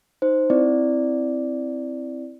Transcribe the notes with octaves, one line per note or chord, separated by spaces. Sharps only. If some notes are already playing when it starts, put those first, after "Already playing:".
D#4 C5
C4 E4 D5